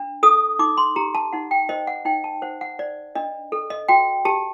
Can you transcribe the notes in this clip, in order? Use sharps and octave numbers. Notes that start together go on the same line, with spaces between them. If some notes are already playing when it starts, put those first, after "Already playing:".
Already playing: D4
A4 D#6
D#4 D6
C6
G4 A#5
A5
D#4 F#5
G5
C5 D#5
F#5
D#4 G5
A5
C5 F#5
F#5
C5 D5
D4 D#5
A4
D#5
F#4 G5
G4 A5